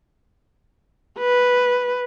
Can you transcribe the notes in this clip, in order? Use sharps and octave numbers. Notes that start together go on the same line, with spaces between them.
B4